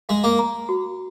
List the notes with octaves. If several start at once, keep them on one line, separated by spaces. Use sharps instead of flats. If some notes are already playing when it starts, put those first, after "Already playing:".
G#3 F5
A#3
A#5
F#4